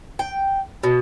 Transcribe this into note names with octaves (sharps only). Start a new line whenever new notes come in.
G5
B2